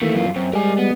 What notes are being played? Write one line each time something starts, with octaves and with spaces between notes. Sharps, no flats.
D#3 E3 A3 A#3
F#2 F4
F#2 C4
G3 G#3 A#4 G#5
B3